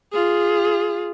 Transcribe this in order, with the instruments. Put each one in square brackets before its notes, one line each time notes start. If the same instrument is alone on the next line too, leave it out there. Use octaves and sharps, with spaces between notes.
[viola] F4 G#4